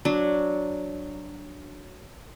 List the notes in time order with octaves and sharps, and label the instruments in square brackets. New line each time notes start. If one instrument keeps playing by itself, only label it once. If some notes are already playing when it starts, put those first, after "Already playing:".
[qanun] F#3 D4